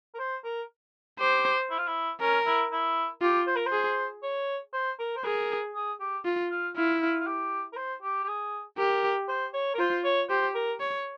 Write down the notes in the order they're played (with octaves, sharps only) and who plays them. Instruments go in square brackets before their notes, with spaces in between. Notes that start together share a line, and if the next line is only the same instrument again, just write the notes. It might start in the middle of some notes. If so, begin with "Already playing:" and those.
[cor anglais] A#4
C5
A#4
[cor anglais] G4 [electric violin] C5
[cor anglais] E4
F4
E4
[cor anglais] C#4 [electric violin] A#4
[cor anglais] E4
E4
[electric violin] F4 [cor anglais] G4
[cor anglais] C5
A#4
C5
[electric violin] G#4
[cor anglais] C#5
C5
A#4
C5
[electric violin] G#4 [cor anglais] A#4
[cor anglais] G#4
G4
[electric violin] F4
[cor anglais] F4
[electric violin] E4 [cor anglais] F4
[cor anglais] F4
F4
G4
A#4
C5
G4
G4
G#4
[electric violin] G4 [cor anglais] A#4
[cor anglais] C5
C#5
A#4
[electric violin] F4 [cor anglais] C5
[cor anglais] C#5
[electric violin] G4 [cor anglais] C5
[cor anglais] A#4
[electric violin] C#5